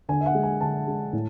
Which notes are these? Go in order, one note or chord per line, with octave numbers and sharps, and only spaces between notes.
D3 G#5
E5
F#5
G#3
G#5
D3 A5
G#3
A2